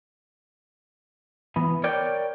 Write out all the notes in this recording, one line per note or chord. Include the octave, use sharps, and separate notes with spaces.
E3 B3
A#4 C#5 D5 G5